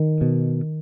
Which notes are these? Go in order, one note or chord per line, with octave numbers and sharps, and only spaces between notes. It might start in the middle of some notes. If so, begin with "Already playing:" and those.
Already playing: D#3
B2